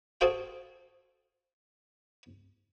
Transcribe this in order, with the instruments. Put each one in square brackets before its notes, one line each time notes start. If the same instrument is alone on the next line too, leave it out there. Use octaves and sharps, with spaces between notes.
[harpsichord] F#4 G#4 A4 C5 F5 G5